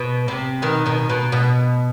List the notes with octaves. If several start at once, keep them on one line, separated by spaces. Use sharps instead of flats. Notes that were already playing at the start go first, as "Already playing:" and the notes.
Already playing: B2
C3
B2 D#3
B2 D#3
B2
B2